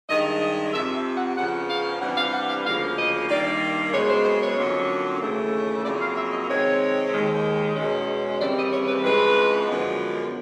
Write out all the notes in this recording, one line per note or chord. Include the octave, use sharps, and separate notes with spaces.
G2 D#3 G#3 D#5
D#5
F2 C3 F3 E5
E5
F#5
E2 C#3 F3 F#5
F5
C3 E3 G3 B3 D4 F#5
F5
F#5
F5
D2 C#3 F3 A#3 F5
D#5
G2 D#3 G3 A#3 D5
F#2 C#3 E3 G#3 B3 C#5
C5
C5
C#5
F2 D3 F#3 A#3 C#4
D#2 C#3 E3 A3
F2 C#3 F#3 A#3 D5
F5
E5
D#5
C3 D#3 G#3 C4 C#5
D#2 D#3 G#3
E2 B2 G#3 C#4
D#2 C#3 E3 G3 C4 D5
D#5
C#5
B4
F2 C#3 E3 G#3 B4
F#2 D3 F3 G#3 B3